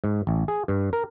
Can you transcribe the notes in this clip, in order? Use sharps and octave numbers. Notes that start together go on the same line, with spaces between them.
G#2
A1
G#4
G2
A#4